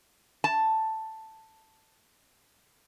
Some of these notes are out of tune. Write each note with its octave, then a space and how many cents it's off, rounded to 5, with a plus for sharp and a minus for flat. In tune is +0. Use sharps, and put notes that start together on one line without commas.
A5 +5